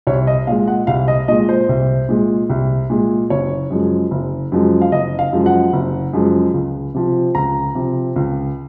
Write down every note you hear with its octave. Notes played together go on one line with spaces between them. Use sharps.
C2 C#5
D#5
A#2 G#3 F5
F#5
C2 F5
D#5
A#2 G#3 D#5
C5
C2
A#2 G#3
C2
A#2 G#3
F#1 C#5
F#2 F3 G#3
F#1
F#2 F3 G#3
F5
F#1 D#5
F5
F#2 F3 G#3
F#5
F#1
F#2 F3 G#3
C#2
C3 F3
C#2 A#5
C3 F3
C#2